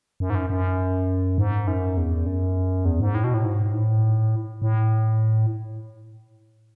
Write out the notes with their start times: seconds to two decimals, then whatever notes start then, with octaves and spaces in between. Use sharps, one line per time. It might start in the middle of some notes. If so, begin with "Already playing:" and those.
0.20 F#2
0.30 G#2
0.35 F#2
0.50 F#2
1.38 G#2
1.67 F#2
1.97 E2
2.26 F#2
2.85 E2
3.00 G#2
3.15 A2
3.24 B2
3.34 A2
3.44 G#2
3.74 A2
4.62 A2